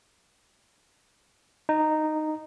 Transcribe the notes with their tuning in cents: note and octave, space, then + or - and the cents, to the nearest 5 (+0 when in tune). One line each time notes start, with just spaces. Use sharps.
D#4 -10